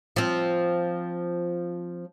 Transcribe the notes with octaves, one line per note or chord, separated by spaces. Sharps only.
F3 C4